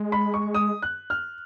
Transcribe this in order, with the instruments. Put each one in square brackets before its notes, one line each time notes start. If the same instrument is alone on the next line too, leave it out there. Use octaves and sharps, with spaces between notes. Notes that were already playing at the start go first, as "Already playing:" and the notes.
Already playing: [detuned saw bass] G#3
[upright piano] B5
C#6
D#6
F#6
F6